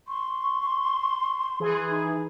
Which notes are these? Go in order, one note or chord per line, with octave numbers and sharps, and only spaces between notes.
C6 C#6
E3 G#4
D#4